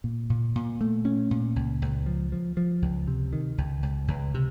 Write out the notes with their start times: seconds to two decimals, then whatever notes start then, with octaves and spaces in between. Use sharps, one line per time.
0.04 A#2
0.30 A#2
0.55 A#2
0.81 A3
1.05 C#4
1.31 A#2
1.56 C#2
1.82 C#2
2.06 F3
2.32 F3
2.57 F3
2.82 C#2
3.08 C3
3.33 D#3
3.58 C#2
3.83 C#2
4.08 C#2
4.34 C3